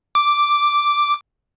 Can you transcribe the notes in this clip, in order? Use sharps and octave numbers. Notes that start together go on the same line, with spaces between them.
D6